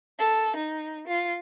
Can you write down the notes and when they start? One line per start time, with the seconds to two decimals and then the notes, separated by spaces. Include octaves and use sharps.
0.19 A4
0.57 D#4
1.07 F4